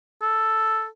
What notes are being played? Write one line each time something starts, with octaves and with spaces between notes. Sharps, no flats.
A4